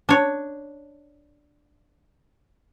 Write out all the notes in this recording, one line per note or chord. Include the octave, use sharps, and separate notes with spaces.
D4 C#5